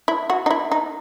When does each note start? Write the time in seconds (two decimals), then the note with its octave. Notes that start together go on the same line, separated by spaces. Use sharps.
0.08 E4
0.30 F#4
0.46 D#4
0.51 E4
0.72 D#4